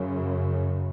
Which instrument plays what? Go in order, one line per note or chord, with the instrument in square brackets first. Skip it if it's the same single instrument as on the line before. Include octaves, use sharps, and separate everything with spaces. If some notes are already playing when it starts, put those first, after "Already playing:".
Already playing: [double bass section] F#2 C#3